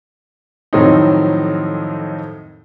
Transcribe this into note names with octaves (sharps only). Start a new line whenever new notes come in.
F2 A2 D#3 F#3 C4 D#4